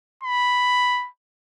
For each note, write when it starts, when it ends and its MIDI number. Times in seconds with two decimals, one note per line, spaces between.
0.23 1.08 83